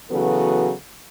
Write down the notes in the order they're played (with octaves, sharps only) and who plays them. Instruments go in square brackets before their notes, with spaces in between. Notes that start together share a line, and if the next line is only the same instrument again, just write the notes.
[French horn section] C#3 E3 F#3 B3 F#4 A4